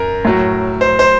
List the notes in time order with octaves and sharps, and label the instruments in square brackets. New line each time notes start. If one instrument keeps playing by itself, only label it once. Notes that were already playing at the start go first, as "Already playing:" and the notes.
Already playing: [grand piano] F#2 A#4
A2 F#3
C5
C5